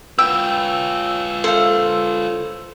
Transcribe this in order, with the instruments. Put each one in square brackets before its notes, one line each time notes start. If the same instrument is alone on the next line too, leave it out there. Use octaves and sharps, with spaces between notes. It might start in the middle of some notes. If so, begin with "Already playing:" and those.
[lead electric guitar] F4 B4 [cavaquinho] G5 [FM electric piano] E6
[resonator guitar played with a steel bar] A4 F5 [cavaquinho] C5